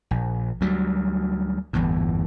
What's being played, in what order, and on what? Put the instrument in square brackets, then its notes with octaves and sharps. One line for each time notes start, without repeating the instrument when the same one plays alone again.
[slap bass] A#1
D2 F#3 G3
G1 E2 A2